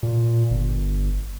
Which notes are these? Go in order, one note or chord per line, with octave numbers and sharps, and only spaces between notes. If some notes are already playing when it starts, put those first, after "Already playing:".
A#2
G1